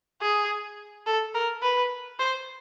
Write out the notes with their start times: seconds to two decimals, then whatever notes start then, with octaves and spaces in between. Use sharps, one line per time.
0.22 G#4
1.07 A4
1.34 A#4
1.62 B4
2.19 C5